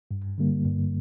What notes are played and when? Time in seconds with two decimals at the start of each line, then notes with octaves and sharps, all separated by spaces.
0.11 G2
0.38 D3 G3 A#3
0.65 G2